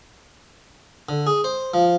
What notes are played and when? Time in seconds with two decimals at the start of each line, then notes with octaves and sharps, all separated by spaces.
1.09 D3
1.27 G#4
1.44 C5
1.74 F3